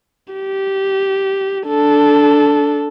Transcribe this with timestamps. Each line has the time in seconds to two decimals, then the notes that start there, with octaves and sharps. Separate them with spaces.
0.34 G4
1.67 D4 A4